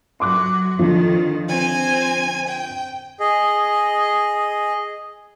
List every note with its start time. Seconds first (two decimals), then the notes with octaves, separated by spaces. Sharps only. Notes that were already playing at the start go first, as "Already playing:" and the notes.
0.20 F#3 F#4 C6 D6 F#6
0.79 F2 D3 D#3 F3
1.48 C4 G#5
2.47 G5
3.20 G#4 D#5